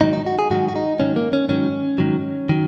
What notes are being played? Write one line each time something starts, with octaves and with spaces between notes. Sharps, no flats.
G#2 D#3 F#3 D#4
D#4
F#4
G#4
G#2 D#3 F#3 F#4
F#4
D#4
G#2 D#3 F#3 C#4
A#3
C#4
G#2 D#3 F#3 C#4
G#2 D#3 F#3
D#3 F#3